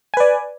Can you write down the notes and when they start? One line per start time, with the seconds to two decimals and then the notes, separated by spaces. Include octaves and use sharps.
0.14 G#5
0.17 B4
0.20 D5